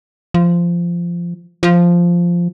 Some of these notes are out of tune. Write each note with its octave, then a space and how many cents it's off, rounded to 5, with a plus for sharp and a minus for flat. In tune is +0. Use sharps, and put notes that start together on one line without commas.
F3 -15
F3 -5